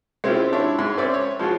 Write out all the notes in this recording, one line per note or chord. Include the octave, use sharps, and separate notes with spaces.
G#3 C4 C#4 E4 F4 G4
C4 D4 E4 C#5
G#2
C4 C#4 D5 E5
C#5
F3 G#3 F4 F#4